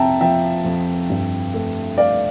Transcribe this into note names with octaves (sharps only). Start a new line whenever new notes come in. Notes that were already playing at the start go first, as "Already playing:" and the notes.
Already playing: F2 C3 E5 G5 A5 A#5
F3 E5 G5
F2
G2
A3
A3 D5 F5